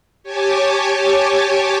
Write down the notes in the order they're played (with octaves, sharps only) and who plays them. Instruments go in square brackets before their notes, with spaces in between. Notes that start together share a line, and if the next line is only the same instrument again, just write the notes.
[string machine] G4 C#5 G#5 A5 D6